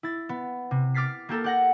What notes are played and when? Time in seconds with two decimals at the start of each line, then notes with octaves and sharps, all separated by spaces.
0.03 E4 A6
0.29 B3
0.71 C3
0.94 D6 F6 A6 B6 C7
1.29 A#3 G4 A4 A#4
1.44 G4 F#5 A#6